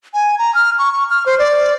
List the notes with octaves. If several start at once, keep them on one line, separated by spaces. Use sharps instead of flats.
G#5
A#5
F6
C#6
C#6
F6
C5
D5